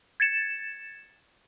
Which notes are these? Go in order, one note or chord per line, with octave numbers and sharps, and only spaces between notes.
G#6 A6 C#7 E7